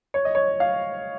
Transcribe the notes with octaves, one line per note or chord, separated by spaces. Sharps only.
C#5
D#5
C#5
F5